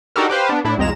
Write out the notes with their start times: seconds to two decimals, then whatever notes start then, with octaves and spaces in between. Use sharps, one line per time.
0.16 D4 D#4 F#4 G4 A4 A#4
0.29 G4 B4 C5 F5
0.49 B3 D4
0.64 A2 D4 E4
0.78 C2 F2 G#3 A#5 E7